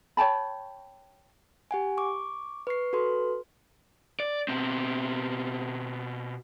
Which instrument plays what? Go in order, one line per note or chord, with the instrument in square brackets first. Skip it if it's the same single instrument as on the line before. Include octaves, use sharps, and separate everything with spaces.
[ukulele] C#5 G5 A5 B5
[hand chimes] G4 F#5 G#5
C#6 D6
B4 C#6 C7
F#4 A4 B4 C6
[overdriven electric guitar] D5
B2 C4